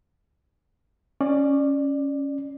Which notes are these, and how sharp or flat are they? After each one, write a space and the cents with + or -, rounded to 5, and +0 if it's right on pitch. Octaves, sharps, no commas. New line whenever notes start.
C#4 +0 D5 +20